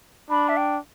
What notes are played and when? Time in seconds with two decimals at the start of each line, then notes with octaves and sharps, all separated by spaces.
0.30 D4 B5
0.49 E5
0.57 G5